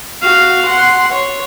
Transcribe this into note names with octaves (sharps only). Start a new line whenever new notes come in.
F#4 F5
F#5 C6
C#5